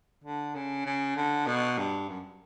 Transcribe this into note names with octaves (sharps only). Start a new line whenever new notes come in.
D3
C#3
C#3
D3
B2
G2
F#2